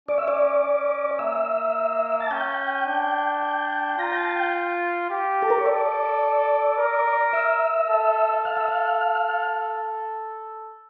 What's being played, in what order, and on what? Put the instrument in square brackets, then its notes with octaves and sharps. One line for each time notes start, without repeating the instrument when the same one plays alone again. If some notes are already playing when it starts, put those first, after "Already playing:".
[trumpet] C#4 [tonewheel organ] D5
[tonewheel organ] E5
D5
[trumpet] C#4
[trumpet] A#3 [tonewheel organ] E5
[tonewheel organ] A5
[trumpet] C#4 [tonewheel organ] G5
[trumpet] D4
[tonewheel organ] G5
[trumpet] F4 [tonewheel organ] A#5
[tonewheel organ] G5
A5
G5
[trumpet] G4
[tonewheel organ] A4
A#4
C#5
[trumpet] A4 [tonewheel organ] D5
[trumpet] A#4
[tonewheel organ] E5
[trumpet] A4
[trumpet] A4 [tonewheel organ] F5
[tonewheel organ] E5
F5